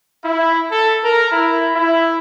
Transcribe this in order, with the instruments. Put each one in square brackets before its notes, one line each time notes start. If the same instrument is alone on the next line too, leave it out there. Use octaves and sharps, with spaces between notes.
[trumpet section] E4
A4
A#4
E4
E4